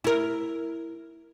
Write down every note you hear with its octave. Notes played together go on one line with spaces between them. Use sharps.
E4 A#4